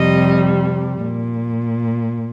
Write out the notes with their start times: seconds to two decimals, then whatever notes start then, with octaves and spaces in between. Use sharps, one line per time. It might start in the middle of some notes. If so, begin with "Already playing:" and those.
Already playing: F2 C3 G3 D#5
1.03 A#2